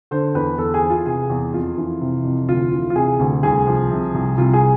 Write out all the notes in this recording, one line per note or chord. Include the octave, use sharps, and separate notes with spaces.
D3 C5
E2 B4
E2 A4
G#4
E3
F4
C3 G#4
E2
F2 F4
E3
C3
F2
D2 F4
E3
F4
C3 G#4
D2
C2 G#4
F3
C3
C2
C2 F4
G#4